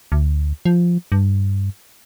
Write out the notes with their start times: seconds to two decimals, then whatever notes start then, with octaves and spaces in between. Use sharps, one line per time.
0.12 D2
0.65 F3
1.12 G2